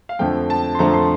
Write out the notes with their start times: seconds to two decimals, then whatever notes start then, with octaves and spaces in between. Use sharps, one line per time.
0.09 F5
0.19 F2 D3 F3 A3 G5
0.50 A5
0.75 C6
0.79 F2 D3 F3 A3 A#5
0.94 C6